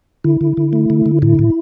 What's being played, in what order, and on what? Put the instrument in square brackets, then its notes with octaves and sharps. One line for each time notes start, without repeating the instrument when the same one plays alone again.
[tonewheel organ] D3 E4
D3
D3
A3
D3
D3
A2 E4
A2